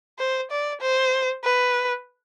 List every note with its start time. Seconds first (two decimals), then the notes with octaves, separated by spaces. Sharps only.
0.19 C5
0.51 D5
0.81 C5
1.44 B4